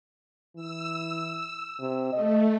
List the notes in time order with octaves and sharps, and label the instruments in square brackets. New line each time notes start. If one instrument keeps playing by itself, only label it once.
[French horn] E3 [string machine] E6
[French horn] C3
[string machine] A3 [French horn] D#5